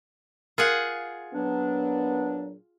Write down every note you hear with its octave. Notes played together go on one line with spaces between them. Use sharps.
F4 G#4 A#4 F5 F#5
A#2 F#3 B3 D4